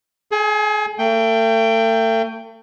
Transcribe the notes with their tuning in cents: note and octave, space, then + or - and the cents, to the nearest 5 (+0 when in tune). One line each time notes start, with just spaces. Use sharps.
G#4 +35 G#5 -20
A3 +40 G5 +0